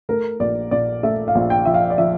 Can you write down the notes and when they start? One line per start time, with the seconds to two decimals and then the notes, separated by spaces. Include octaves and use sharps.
0.09 A3 A#4
0.40 A#1 D5
0.71 A#2 D5
1.03 A3 E5
1.28 F5
1.35 A#1
1.50 G5
1.65 F3 E5
1.74 F5
1.90 D5
1.98 F3 E5